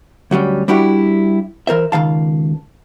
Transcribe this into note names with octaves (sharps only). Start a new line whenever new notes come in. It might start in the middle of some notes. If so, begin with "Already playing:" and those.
D2 F#3 G3 C#4
G3 D4 E4 F#4 G4
E3 A#4 C5 E5
C#2 D#3 F5 A5